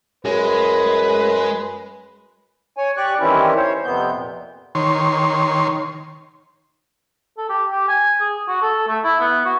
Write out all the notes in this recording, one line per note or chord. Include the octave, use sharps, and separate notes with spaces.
F#2 G#3 B4
C#5 G#5
G4 D5 C#6 F#6
D#3 E3 G3 C4 C#4 E4
C5 C#5
F2 C3 B3 G6
A#2
D#3 C#5 C6
A4
G4
G4
G#5
G#4
F#4
A4
A3
E4
B3
F#4